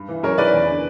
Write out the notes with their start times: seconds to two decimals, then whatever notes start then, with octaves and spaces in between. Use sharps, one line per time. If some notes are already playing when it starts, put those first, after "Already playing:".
Already playing: G2
0.09 E3
0.23 F#2 A#4 C#5
0.38 E3 B4 D5
0.53 E2
0.68 D3